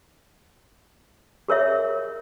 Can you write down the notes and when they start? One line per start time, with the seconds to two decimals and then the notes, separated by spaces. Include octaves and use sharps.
1.48 G#4 A#4 C#5 E5